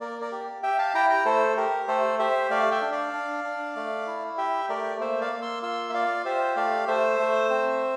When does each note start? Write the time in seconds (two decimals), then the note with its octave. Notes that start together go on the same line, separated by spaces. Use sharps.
0.01 A#3 A#4 D5
0.21 A#4 D5
0.32 G4
0.63 G4 E5 G5
0.79 F5 A5
0.95 E4 G5 A#5
1.10 G5 A#5
1.25 A3 A4 C5
1.57 G4 A#4
1.88 A3 A4 C5
2.19 G4 C5 E5
2.50 A3 D5 F5
2.71 E5 G5
2.82 D4
2.92 D5 F5
3.13 D4
3.44 D4
3.76 A3
4.07 E4
4.37 G4 E5 G5
4.69 A3 A#4 D5
5.00 A#3 C5 E5
5.21 D5 F5
5.32 A#3
5.42 C6 E6
5.62 F4 C6 E6
5.89 E5
5.94 F4 D5 F5
6.25 G4 C5 E5
6.56 A3 D5 F5
6.88 A3 C5 E5
7.19 A3
7.50 C4